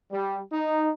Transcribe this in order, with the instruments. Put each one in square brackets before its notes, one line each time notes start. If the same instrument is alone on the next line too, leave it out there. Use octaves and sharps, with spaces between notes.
[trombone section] G3
D#4